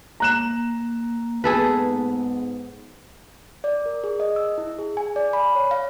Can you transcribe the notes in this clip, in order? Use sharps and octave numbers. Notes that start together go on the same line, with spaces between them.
A#3 A#5 F#6 E7
G#2 B3 G#4 A4 B4
D5
A#4
G#4
D#5
E6
E4
G#4
G#5
D5
B5
C#5
F5